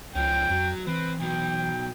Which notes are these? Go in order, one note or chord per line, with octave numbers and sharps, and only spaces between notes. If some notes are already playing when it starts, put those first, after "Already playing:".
C#2 F3 C#4 G5
F2 F#3
E3 C4 B4
B2 F#3 G5